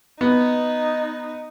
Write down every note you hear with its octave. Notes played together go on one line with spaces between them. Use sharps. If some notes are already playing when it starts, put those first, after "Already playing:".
B3 D#4